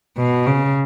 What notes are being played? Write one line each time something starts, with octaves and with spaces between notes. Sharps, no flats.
B2
C#3